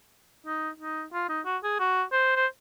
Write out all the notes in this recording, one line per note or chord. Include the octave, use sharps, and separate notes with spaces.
D#4
D#4
F4
D#4
F#4
G#4
F#4
C5
C5